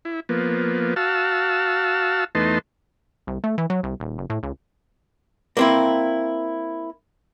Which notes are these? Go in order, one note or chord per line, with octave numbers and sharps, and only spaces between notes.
E4
F3 A#3 B3
F#4 F5 A5 E6
E2 A3 B3 D#4 A5 C6
C2
A3
E3
F#3
C2
D#1
F#1
A2
C#2
A#3 C4 E4